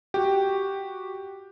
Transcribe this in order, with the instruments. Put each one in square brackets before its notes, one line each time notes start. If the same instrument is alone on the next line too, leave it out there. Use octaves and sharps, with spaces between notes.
[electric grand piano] F#4 G4 G5